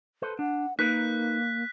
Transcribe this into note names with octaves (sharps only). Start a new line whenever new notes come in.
A4 B4 C5
D4 F#5
A#3 D#4 A#4 B4 F#6 B6